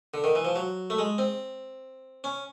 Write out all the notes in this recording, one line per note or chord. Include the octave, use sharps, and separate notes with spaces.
D3
D#3
E3
F3
F#3
A3
G#3
C4
C#4